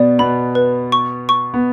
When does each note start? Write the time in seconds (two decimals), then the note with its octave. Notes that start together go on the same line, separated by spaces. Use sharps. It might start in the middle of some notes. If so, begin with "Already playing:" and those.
Already playing: B2 B3 D5
0.19 B2 B3 B5
0.55 B4
0.92 C#6
1.29 C#6
1.54 B3